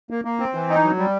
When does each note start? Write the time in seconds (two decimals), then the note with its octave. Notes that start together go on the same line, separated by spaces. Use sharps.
0.10 A#3
0.25 A#3
0.40 C4
0.54 E3
0.69 D#4
0.84 F#3
0.98 G3